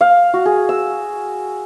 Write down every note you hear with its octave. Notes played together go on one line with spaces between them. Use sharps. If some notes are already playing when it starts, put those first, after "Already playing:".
F5
F#4
G#4
E6